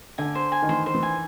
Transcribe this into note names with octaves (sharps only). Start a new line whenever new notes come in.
D3 G#5
C5
G#5
D#3
E3 C5
C5
E3
G#5